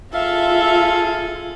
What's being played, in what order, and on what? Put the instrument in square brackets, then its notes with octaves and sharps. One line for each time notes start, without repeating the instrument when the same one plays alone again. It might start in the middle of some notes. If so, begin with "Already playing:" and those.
[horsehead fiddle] F4 [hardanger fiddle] G#4 A4 [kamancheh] E5 [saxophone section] F5